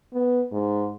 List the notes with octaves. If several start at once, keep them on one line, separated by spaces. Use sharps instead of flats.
B3
G#2